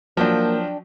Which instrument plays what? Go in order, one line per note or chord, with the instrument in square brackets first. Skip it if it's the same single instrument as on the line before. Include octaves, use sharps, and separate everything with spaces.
[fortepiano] F3 F#3 [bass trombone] A#3 [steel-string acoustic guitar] D4 G5